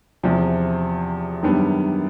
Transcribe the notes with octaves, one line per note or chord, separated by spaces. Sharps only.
E2 C3 F3
F#2 D#3 G3 B3 D4